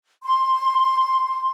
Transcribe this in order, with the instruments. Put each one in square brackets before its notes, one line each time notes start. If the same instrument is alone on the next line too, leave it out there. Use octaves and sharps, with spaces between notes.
[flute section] C6